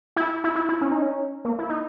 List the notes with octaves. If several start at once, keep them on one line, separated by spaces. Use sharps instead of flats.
E4
E4
E4
E4
C#4
D#4
C#4
A#3
E4
D#4